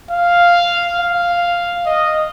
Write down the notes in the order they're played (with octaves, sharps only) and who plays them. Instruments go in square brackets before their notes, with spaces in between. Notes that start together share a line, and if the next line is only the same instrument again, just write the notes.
[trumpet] F5
F5
D#5